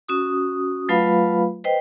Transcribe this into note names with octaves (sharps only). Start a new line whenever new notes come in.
C#4 F#4 D#6
F#3 A3 F4 B4 F5 B5
B4 C5 D#5 G5